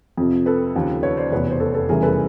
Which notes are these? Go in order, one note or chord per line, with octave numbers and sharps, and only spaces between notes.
F2 C3 F3
A4 B4
D#2 C#3 F3
B4 C#5
C5 D5
F1 E2 B2 B4 C#5
C5
A4 B4
A4 B4
F1 E2 C#3 E3 G3 G#4 A#4
A4 B4